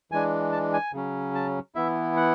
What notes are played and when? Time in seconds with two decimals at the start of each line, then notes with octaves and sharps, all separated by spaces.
0.12 E3 G#3 D4 G#5
0.52 A5
0.73 G#5
0.93 C#3 F#3 C#4
1.35 A5
1.75 E3 B3 E4 E5
2.16 F#5